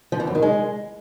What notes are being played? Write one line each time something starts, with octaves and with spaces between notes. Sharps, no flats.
F3
E3
F#2
D#3
G#3